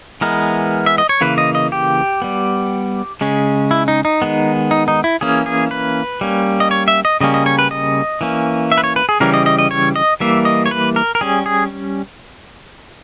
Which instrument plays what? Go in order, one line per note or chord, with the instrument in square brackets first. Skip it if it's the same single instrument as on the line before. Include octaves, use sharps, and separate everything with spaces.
[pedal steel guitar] E3 G#3 B3 A#4
E5
D#5
C#5
C#3 E3 A#3 B4
D#5
D#5
G4
G3 B3
C#3 G#3 C#4
E4
D#4
D#4
D#3 G#3 B3
D#4
D#4
E4
E3 A#3 C#4 G#4
G#4
B4
G3 A#3 C#4
D#5
C#5
E5
D#5
C#3 G3 A#3 C#4 D#5
D#5
C#5
B4
D#5
E3 A#3 C#4
E5
B4
C#5
B4
G#4
C#3 E3 G3 C#4 A#4
D#5
D#5
D#5
C#5
D#5
E3 G3 A#3 E5
D#5
C#5
B4
A#4
A#4
G3 C#4 G#4
G#4